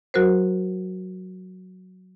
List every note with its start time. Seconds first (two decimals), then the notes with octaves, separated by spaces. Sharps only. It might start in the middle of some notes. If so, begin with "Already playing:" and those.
0.14 F#3 F#4 A#4 C5